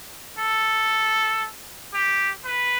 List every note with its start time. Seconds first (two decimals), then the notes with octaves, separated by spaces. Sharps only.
0.39 A4
1.94 G4
2.46 B4